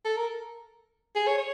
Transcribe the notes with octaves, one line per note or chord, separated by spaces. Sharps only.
A4
A#4
G#4
C#5
C#5